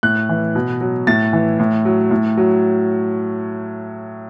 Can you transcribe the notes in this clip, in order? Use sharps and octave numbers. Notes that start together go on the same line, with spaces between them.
A2 F#6
E3
B2
F#3
A2 A6
E3
A2
F#3
A2
F#3